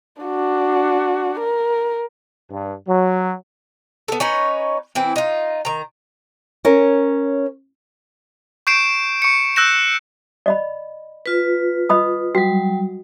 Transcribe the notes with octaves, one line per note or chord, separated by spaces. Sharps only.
D4 F#4
A#4
G2
F#3
B3 A4
C#4 D#4 B4 C#5
E3 C4 E4
D#4 F4
D#3 A#5
C#4 A#4 C#5
C#6 G6 C7 D7 E7
C#6 C#7
E6 F#6 G6 A#6 E7
D5 D#5 B5
F4 B4
D#5 B5 D#6
F#3 G3 F#4